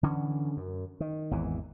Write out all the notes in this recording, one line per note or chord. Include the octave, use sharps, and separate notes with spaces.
D3 E3 C#4
F#2
D#3
G#1 E2 E3